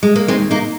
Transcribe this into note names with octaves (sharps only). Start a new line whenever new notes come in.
G#3
A#3
D#2 G#3 C4
A#3 D#4